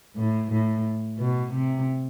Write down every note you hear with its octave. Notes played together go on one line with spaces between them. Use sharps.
A2
A2
B2
C3